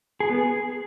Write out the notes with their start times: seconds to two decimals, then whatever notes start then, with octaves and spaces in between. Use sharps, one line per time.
0.20 G#4
0.30 B3
0.39 G#4